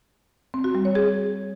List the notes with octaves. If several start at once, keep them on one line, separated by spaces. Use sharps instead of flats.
C4
F#4
G3
C#5
G#4